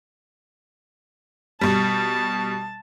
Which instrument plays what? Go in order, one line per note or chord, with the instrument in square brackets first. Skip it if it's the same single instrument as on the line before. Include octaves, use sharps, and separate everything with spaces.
[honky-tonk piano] B2 G3 [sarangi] A5